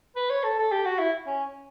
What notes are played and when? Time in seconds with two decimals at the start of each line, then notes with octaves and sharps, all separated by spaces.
0.16 B4
0.30 C#5
0.43 A4
0.58 A4
0.71 G4
0.85 F#4
0.99 E4
1.26 C#4